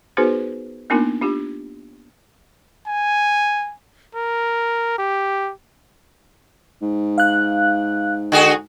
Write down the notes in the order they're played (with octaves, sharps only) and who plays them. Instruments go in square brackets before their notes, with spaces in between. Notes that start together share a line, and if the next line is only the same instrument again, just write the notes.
[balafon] B3 D#4 F#4 G#4 B4 C5
A#3 B3 D4 D#4 F4 A#4
D4 F4 G4
[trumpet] G#5
A#4
G4
[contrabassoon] G#2
[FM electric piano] F5 F#6
[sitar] D3 F#4 G#4